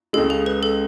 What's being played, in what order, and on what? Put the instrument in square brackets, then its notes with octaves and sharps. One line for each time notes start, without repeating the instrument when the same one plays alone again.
[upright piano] C#2 C#3 G#3 [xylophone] A4
[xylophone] G#4
B4
A4